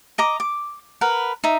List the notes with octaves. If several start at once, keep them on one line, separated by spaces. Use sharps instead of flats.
D#5 A#5 D6
D6
A#4 B4 F#5
D#4 E5